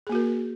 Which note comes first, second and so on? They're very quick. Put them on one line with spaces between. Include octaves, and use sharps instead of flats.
G#4 A#3 F#4 A#4